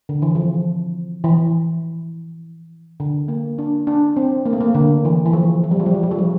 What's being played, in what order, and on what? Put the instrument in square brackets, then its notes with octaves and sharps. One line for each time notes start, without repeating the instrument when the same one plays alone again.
[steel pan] D3
E3
F3
E3
D3
A#3
D4
D4
C4
A#3
A3
A#3
D3
E3
E3
F3
F3
G3
F3
G3
F3
G3
F3
G3